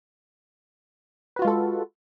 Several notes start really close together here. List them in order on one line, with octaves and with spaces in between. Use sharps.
B4 F#4 F4 G#3 A4